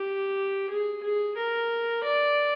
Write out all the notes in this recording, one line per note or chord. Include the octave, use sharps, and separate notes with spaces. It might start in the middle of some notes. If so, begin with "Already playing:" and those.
Already playing: G4
G#4
G#4
A#4
D5